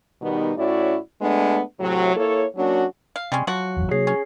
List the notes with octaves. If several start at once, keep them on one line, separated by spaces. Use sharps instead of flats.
B2 D#3 G3 B3 D#4
A2 C#4 E4 F#4 D5
G#3 A3 B3 D4
A2 C3 F#3
A#3 E4 A4 C#5
F#3 A#3 C#4 D4 F#4
F5
C3 G3 G#3 C#4
F3 F#3 F#4
F#1 E2
C3 A#3 D4 G#4 C#5 C7
C#4